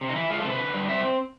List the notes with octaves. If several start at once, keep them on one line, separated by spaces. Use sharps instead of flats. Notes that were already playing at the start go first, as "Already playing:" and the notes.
C3
D#4
E3 E4
G#3 F4
A4
C3
B4
D3
G3
C4 E5